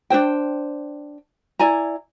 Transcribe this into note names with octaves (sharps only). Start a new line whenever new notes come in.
D4 F4 C5 G5
E4 D5 G#5 A#5